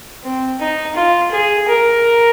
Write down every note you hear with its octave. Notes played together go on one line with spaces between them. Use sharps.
C4
D#4
F4
G#4
A#4